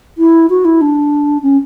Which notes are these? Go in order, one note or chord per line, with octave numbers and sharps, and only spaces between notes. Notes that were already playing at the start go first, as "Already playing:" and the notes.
E4
F#4
E4
D4
C#4